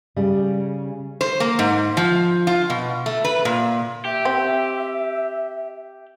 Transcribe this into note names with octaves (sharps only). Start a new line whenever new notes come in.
C#3 G3
C5
A#3
G#2
F3
F4
B2
A3
B4
A#2
G4 E5
C4